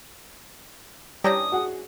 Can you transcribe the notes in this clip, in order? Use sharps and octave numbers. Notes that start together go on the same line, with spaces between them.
E3 G3 C#4 D4 G5 A#5 D#6
F#4 G#4 F#5